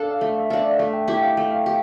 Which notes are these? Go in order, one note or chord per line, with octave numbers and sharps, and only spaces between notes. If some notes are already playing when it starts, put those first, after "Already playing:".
Already playing: D4 A4 F5
F5
A3 E5
E5
D4 A4 F5
D5
E5
A3 F5
G5
E4 G4
G5
F5
A3 G5
F5
G4